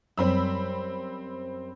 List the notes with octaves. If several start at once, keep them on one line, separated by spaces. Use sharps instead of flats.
F#2 G3 C4 B5 E6